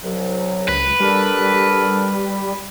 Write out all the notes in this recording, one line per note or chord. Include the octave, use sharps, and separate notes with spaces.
C2 F#3
C#2 B4
G3 D4 A4 A#4
G3